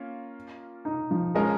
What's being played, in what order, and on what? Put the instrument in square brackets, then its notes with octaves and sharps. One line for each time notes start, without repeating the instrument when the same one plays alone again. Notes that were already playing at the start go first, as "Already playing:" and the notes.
Already playing: [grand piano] A#3 C#4 F4
[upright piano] D#4
F3
[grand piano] F3 C#4 A#4 D#5 [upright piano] G#3